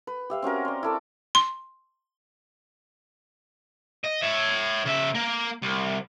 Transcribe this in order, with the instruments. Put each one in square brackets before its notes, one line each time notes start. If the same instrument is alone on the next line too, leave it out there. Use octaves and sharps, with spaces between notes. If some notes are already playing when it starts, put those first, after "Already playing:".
[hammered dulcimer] B4
G4 E5 F5
C4 C#4 F#4 A#4
D5 C6
E4 A4 D6
[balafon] C6
[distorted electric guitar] D#5
C#5 E5
C#3 E5
A#3
C2